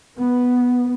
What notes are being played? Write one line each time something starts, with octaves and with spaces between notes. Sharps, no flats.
B3